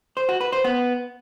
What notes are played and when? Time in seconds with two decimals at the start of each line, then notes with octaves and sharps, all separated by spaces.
0.17 C5
0.29 F#4
0.41 B4
0.52 C5
0.64 B3